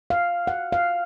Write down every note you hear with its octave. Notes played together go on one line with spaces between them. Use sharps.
F5
F#5
F5